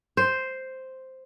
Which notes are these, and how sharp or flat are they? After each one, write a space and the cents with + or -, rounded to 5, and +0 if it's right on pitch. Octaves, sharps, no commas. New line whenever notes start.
C5 +0